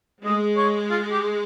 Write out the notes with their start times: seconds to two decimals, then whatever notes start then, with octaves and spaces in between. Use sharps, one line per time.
0.25 G#3 D#5
0.57 C#5
0.91 F4
1.11 G4